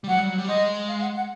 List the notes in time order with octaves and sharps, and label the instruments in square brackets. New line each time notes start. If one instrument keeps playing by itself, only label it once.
[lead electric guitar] G3
[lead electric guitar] F#3 [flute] F#5
[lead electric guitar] G3
F#3
G3
[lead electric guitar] G#3 [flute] D#5
[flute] F5
F#5
F#5